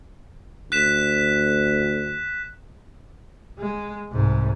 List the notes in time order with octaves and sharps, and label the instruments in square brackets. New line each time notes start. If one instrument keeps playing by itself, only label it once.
[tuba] D2 [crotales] F#6 B6 E7
[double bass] G#3
C2 G#2